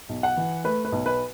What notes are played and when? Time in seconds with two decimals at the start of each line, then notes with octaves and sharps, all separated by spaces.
0.09 B1
0.23 F#5
0.37 E3
0.64 A3 B4
0.85 B4
0.92 B1
1.06 B4